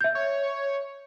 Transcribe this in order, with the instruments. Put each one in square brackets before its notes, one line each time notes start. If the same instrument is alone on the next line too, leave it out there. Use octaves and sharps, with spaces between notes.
[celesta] E5 G6
[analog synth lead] C#5